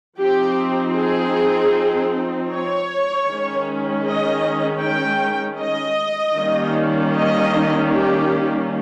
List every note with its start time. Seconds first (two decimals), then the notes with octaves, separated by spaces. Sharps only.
0.19 F3 C4 D#4 G4
0.97 G#4
2.52 C#5
3.29 D#3 G#3 C#4
4.06 D#5
4.84 G5
5.61 D#5
6.39 D#3 G3 A#3 C#4
7.16 D#5
7.94 G4